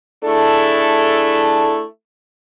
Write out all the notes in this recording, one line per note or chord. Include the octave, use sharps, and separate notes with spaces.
A3 D4 E4 G#4 A4